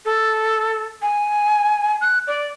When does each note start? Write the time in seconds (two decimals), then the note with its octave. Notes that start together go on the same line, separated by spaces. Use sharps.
0.05 A4
1.02 G#5
2.01 F#6
2.27 D5